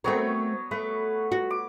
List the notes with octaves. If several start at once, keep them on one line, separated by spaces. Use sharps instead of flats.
F#3 A3 B3 C4 A#4 C#5
A3 B4
F#4
D6